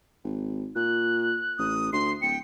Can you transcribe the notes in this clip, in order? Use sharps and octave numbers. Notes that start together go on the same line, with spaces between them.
G#1
A#2 F#6
A1 D#6
D2 C6 C7
D1 G5 C#7